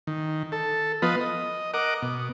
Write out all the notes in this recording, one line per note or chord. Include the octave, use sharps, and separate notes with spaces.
D#3
A4
F3 B3 F4 B4 D#5
D#5
A#4 D#5 F#5 D6
B2